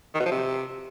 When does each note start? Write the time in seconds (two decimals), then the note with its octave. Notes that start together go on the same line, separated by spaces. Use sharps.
0.15 D#3
0.20 B2
0.26 F3
0.31 C3